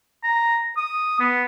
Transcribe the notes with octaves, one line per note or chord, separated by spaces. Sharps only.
A#5
D#6
B3